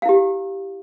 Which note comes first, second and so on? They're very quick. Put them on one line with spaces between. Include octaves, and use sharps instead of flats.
F5 E4 G4